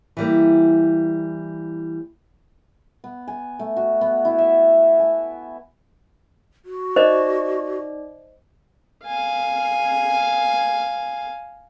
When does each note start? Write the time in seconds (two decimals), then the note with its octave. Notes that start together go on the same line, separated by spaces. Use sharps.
0.17 E3 G3 A#3
3.04 B3
3.28 G#5
3.59 A3
3.76 F#4
4.01 B3
4.25 E4
4.38 E5
4.99 G#5
6.65 F#4
6.96 D#4 C5 D5 D#5
9.05 F5 G#5